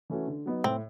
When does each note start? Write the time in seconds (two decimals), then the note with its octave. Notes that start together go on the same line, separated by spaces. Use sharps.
0.10 E3 A3 C#4 F#4
0.27 D3
0.46 F#3 B3 D#4
0.64 A2 C4